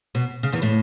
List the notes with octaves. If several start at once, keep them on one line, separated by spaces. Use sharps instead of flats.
B2
C#3
E2 E3
A2 A3